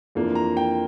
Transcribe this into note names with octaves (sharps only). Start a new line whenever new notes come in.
F2 E3 A#3 D4 F4
A#5
G5